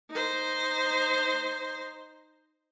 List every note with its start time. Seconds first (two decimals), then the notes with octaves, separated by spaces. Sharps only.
0.11 D#4 C5